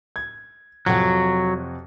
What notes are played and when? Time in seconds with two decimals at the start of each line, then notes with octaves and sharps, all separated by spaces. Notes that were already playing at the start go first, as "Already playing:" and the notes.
0.16 G#6
0.86 F2 C3 F#3 F#5